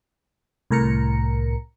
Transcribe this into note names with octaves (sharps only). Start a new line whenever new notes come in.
C2 A2 A#4 A#5 C#7